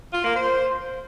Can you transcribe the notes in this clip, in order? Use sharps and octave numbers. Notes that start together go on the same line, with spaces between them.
F4
A#3
C5